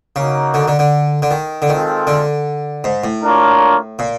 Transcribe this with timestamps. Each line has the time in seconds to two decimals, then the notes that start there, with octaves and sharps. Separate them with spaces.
0.15 C#3 A#3 D#4 F#4
0.54 D3
0.68 D3
0.79 D3
1.22 D3
1.31 D#3
1.62 D3
1.69 D#3 G#3 C4 F4 A4 C5
2.07 D3
2.84 G#2
3.04 A2
3.23 A#3 D4 F4 A#4 C#5
3.99 A#2